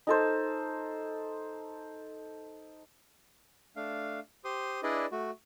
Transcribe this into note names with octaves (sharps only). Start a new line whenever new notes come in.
D#4 A4 C5
A3 D4 F5
G4 C5 C6 D#6
D4 E4 G#4 B4 D5 D#5
A3 F#4